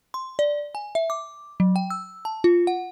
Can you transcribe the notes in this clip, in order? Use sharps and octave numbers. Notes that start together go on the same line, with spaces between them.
C6
D5
G#5
E5
D6
F#3
G5
E6
A5
F4
F#5